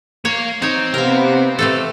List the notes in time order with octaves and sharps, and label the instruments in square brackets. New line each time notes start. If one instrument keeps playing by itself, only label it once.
[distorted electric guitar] A#3 F5 [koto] C#5
[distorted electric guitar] C4 [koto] D#4 C#5
[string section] C3 B3 [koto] A#4 F5
[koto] C3 A3 A4